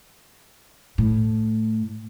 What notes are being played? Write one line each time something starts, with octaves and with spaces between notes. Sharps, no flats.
A2